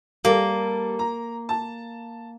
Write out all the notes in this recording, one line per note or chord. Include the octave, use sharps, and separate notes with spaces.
G3 A#3 A4
A#5
A5